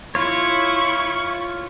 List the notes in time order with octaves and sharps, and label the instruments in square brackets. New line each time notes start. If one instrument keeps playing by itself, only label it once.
[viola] E4 C#6 [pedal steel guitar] F4 C#5